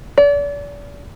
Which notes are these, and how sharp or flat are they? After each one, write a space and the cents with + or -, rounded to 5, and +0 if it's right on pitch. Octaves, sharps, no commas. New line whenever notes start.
D5 -35